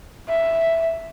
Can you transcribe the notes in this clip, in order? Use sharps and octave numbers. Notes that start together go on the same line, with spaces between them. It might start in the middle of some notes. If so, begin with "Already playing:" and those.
E5